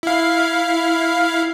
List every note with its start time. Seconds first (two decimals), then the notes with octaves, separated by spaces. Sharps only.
0.03 E4 F5